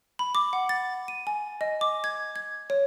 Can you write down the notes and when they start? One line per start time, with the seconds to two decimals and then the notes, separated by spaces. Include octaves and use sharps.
0.19 B5
0.35 D6
0.53 F#5
0.69 A6
1.08 D#7
1.27 G#5
1.61 D#5
1.81 D6
2.04 G#6
2.36 G#6
2.70 C#5